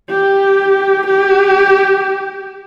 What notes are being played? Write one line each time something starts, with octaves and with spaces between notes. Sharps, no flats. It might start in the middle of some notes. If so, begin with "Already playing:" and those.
G4
G4